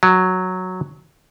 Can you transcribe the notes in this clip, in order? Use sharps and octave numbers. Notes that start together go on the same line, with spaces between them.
F#3